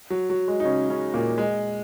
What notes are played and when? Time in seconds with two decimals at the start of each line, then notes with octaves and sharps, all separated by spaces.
0.10 F#3
0.30 F#3
0.48 G#3
0.60 D#4
0.65 C#3 C#4
0.89 C#3 C#4
1.14 A#2 A#3
1.38 G#3